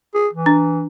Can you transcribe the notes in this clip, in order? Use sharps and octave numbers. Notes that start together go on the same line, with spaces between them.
G#4
E3
D4